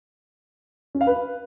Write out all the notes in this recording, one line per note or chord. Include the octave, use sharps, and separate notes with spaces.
C#4
F5
B4